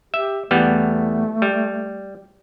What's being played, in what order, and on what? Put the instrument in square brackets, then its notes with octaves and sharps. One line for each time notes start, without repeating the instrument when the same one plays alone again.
[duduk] G4 [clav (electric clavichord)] E5
[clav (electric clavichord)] E2 G3 B3 [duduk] A3
[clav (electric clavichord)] G3